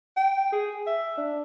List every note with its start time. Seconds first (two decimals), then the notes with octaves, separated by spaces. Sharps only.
0.17 G5
0.52 G#4
0.87 E5
1.18 D4